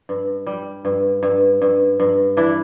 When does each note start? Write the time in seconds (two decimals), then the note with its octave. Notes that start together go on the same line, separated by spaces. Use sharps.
0.09 G2
0.47 G3
0.85 G2
1.23 G2
1.62 G2
2.00 G2
2.37 E3 D4 E4